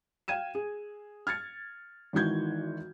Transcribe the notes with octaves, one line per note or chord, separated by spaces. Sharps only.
F5 G5 G#6 D#7 E7
G#4
F6 G#6 A6 C#7
G#1 D#3 E3 F#4 G6 G#6